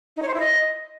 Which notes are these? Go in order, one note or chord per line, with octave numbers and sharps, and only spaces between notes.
D#4
C#5
C5
E4
D#5